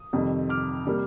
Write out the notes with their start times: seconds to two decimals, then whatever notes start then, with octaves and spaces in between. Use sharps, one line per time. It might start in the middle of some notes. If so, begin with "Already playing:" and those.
Already playing: D#6
0.13 F2 C3 D#3 G3
0.49 D6 F6
0.87 C3 G3 A#3